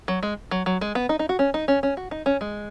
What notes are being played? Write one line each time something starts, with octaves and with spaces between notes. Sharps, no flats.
F#3
G#3
F#3
F#3
G#3
B3
D#4
D#4
F#4
C#4
D#4
C#4
C#4
F#4
D#4
C#4
G#3